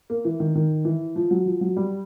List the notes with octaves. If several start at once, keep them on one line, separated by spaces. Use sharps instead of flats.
A#3
E3
D#3
D#3
E3
F3
F#3
F3
F#3
G3